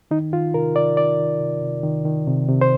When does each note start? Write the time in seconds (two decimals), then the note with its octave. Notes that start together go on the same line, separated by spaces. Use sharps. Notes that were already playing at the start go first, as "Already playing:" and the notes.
0.11 D#3 D#4
0.33 D#3 F4
0.54 C3 A#4
0.76 C3 D5
0.97 D#3 D5
1.19 D#3
1.40 C3
1.62 C3
1.83 D#3
2.05 D#3
2.27 C3
2.48 C3
2.61 C5